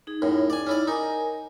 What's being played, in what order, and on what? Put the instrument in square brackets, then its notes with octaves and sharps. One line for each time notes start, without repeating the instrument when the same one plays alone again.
[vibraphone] D#4 G#4
[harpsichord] F#2 A2
D5 G#5
C#4 E4 D5
[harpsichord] D#4 [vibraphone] A#4 G#5